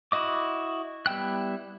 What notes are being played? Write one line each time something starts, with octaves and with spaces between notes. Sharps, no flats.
E4 F#4 D#5 D6
G3 B3 E4 G5 F#6